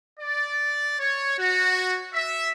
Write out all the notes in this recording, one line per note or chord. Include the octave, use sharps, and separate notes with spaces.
D5
C#5
F#4
E5